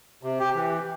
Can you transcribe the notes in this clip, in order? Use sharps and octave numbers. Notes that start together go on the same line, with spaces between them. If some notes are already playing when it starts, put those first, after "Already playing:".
C3
G4
E3